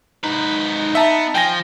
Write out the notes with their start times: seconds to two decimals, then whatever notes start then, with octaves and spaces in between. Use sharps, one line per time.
0.24 G#2 D#4 B4
0.95 B3 E5 A5 A#5
1.35 F3 G5 G#5 A#6